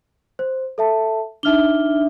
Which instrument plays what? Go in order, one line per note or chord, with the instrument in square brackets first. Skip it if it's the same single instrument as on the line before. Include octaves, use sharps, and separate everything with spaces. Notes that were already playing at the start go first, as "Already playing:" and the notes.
[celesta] C5
A4 E5 A5
[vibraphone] D4 E5 [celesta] D#4 F6 G7